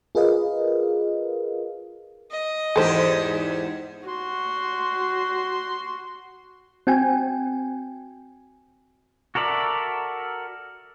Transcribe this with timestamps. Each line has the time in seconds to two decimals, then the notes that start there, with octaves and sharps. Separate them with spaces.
0.15 F4 G#4 A#4 B4 D#5 F5
2.31 D#5
2.76 E2 G#2 G4 A4 C5
4.08 F#4 C6
6.87 C4 F#4 G5 G#5
9.35 F#4 A4 A#4 D5 E5